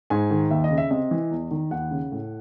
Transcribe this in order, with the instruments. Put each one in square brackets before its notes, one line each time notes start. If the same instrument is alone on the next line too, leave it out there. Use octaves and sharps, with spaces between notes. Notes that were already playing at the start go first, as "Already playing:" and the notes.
[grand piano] G#2 G#5
D#3
D#2 E5
D#5
C#3
E5
C3 D#5
E3
E2
D#3
D#2 F#5
C#3
A2